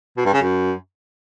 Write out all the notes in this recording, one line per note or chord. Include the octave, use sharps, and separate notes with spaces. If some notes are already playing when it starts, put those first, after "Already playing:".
B2
G2
C#3
F#2